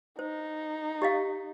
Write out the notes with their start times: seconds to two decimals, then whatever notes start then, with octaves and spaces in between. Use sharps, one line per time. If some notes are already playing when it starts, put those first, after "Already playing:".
0.19 D#4 C5
1.02 G4 D#5 F5